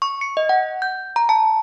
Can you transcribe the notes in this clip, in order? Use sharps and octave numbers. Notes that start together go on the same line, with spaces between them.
C#6
C#7
D#5
F#5
G6
A#5
A5